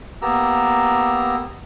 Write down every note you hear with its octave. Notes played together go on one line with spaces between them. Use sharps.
A#3 B3 G4 A#5 E6